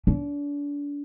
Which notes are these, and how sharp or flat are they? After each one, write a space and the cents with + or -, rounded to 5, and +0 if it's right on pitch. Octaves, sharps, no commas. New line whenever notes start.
D4 -35